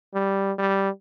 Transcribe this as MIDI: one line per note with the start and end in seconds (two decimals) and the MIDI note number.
0.14 0.52 55
0.59 0.90 55